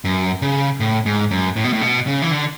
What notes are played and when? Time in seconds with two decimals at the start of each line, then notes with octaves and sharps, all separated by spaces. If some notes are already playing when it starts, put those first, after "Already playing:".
0.05 F#2
0.42 C#3
0.80 A2
1.06 G#2
1.31 F#2
1.56 A2
1.64 B2
1.73 A2
1.81 B2
2.07 C#3
2.22 E3
2.31 D3